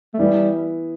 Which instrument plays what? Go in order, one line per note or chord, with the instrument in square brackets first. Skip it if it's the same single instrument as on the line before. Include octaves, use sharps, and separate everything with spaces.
[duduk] A3
[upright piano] E3 B3 E4 [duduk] G3